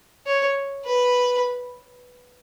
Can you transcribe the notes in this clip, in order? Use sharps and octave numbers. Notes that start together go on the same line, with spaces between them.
C#5
B4